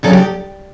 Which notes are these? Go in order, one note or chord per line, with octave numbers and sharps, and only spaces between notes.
D2 C#3 F#3 A4
G4